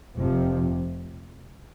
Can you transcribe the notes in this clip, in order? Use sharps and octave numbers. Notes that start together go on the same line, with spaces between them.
F1 F2 C3 F3